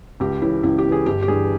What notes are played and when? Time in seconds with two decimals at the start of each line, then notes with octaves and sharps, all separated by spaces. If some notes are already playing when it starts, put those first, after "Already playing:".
0.20 C#2 G4
0.42 C#3 E3 E4
0.63 C#2 E4
0.78 G4
0.85 C#3 E3
0.92 G#4
1.06 G1 G4
1.22 G4
1.28 G2 E3 G#4